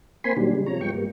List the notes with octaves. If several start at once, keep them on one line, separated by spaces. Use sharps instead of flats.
A#3 C4 G#5 B5 C6
A#2 D#3 F#3 G3 D4
C#3 G3 G#3
C3 F3 C#5 A#5
G2 F3 G#3 B3 G5 C#6
G#2 G3 A#3